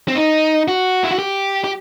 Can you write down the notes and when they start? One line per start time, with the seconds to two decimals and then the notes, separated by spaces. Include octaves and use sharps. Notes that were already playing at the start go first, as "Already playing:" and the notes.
0.08 C4
0.15 D#4
0.68 F#4
1.04 E4
1.11 F#4
1.19 G4
1.64 G4